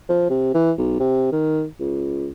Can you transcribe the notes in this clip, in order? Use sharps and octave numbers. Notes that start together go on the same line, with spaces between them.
F3
C3
E3
B1
C3
D#3
C#2